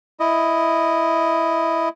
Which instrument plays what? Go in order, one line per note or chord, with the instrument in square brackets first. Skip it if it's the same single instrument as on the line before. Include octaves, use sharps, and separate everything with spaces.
[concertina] E4 D#5